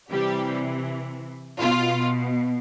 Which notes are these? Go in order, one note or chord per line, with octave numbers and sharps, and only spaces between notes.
C3 E3 G3 G4
B2 F4